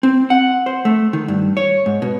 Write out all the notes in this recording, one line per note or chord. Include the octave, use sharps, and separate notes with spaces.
C4
F#5
C5
A3
D#3
G2
C#5
G#2
B2